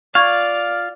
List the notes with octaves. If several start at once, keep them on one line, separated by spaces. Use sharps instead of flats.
F4 D5 F5 C#6 G#6